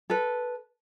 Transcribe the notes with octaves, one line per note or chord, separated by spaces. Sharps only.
A4 B4